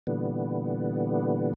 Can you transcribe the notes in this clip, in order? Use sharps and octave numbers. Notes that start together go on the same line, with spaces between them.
A#2 D3 E3 G3 B3